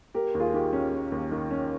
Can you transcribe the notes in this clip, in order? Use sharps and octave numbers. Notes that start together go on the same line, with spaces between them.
A#3 G4 A#4
D#2
F4 G#4
D#3 G4
F4
C#4
A#3
D#2
D#3
C#4